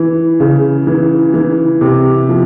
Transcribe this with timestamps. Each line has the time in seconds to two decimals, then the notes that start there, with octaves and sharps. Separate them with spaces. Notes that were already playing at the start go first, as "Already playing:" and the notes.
Already playing: E3
0.40 C#3
0.87 E3
1.34 E3
1.81 C3
2.29 F3